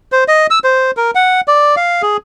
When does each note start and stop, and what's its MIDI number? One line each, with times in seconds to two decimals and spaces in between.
0.12 0.24 72
0.28 0.47 75
0.50 0.59 88
0.64 0.91 72
0.97 1.11 70
1.15 1.41 78
1.48 1.76 74
1.76 2.02 77
2.02 2.17 68